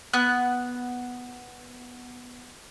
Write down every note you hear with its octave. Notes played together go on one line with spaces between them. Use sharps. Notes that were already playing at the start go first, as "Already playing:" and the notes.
B3 F#6